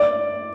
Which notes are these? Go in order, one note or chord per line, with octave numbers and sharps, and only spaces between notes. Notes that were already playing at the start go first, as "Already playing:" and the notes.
Already playing: D5